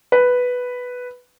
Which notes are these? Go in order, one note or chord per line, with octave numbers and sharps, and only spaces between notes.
B4